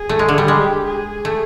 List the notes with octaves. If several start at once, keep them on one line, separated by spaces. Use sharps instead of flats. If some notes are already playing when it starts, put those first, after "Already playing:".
Already playing: G#4
A3
G#3
D3
G3
G#3 G4
G#4
A3